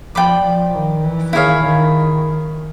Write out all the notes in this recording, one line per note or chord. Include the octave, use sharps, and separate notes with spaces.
F3 D5 G5 B5 D6
F3
D#3
E3
D#3 E4 G#4 C#5 F5
D#3